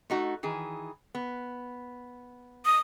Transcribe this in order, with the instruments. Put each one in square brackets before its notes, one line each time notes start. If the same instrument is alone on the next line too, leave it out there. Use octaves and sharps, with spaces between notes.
[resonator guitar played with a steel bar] A3 D#4 F#4
D#3 E3 G#4
B3
[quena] D#6